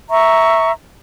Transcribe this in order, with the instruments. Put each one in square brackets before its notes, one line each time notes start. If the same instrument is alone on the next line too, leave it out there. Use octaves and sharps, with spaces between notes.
[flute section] E5 A#5 C#6